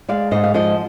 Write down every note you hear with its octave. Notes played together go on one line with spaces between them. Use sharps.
G#3 D5 F5
G#2 C5 D#5
F5
F3 C5 D#5